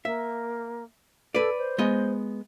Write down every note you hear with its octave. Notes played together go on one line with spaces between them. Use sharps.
A#3 E5
A4 B4 D5
C5
G#3 B3 D#5